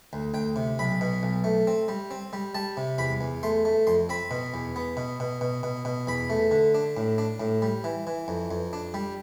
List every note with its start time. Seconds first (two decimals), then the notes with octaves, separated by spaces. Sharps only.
0.13 D2
0.34 D2 G5
0.56 C3
0.79 B1 B5
1.01 B2
1.23 B1
1.44 A3
1.67 C4
1.88 G3
2.11 C4
2.33 G3
2.55 G3 A5
2.77 C3
2.98 E2 B5
3.21 E2
3.43 A3 C6
3.65 A3
3.87 F2 C6
4.09 C4 B5
4.31 B2
4.54 E2
4.76 B3
4.97 B2
5.20 B2
5.41 B2
5.63 B2
5.85 B2
6.07 E2 B5
6.30 A3
6.51 D3
6.75 D4
6.97 A2
7.18 D4
7.40 A2
7.62 G3
7.84 E3
8.07 E3
8.28 F2
8.51 F2
8.73 D4
8.94 G3